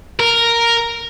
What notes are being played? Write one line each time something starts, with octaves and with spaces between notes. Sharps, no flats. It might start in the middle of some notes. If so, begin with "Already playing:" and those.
A#4